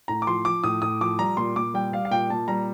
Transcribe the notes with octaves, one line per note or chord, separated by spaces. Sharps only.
A2 A#5
D6
F3 C6
F3 D6
A2 D#6
A2 D#6
F3 D6
G3 A#5
A#2 C6
A#2 D6
G3 G5
G3 F5
F5
A#2 G5
A#2 A5
G3 A#5